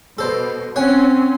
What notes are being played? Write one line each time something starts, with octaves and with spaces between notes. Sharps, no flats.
B2 A4 C5
C4 C#4 C#5 F#5 G#5